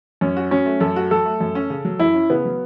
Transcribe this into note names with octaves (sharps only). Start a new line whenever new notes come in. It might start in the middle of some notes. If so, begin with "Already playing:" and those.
F#2 C#4
F#4
F#3 C#4
A3
F#2 A4
F#4
F#3 A4
A3
F#2
C#4
C#3
F#3
F#2 E4
C#4
C#3 B3
F#3